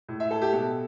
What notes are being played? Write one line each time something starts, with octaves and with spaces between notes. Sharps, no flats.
A2
E5
A2 A4
G4
B2 A4